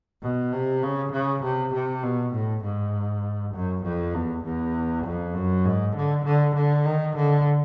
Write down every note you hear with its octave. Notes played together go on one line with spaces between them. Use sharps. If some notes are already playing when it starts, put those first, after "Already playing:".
B2
C3
C#3
C#3
C3
C3
B2
A2
G#2
F#2
F2
E2
E2
F2
F#2
G#2
D3
D3
D3
D#3
D3